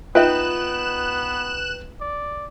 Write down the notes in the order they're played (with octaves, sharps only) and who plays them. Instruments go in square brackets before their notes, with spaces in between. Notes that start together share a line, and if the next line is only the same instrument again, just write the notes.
[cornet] B3 [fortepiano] D#4 B4 G5 [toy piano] F4 E5 [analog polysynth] F#6 E7
[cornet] D5